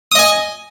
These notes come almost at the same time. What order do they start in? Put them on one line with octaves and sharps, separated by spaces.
D#6 D#5 G#5